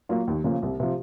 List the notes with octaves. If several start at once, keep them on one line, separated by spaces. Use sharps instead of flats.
F#3 A#3 F4
D#2
C#3 F3 A#3
C2
C3 F3